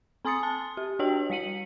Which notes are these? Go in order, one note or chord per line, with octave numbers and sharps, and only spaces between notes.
C4 G#5 C6 D#6 A6 C#7
A5
G4
D4 F#4 C#5 G5 F#7
G3 B6 C#7 D#7 F#7